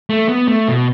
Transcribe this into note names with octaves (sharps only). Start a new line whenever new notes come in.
A3
B3
A3
B2